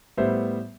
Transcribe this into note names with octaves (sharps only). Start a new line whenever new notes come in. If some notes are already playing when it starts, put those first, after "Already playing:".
A2 G3 B3 C5 E5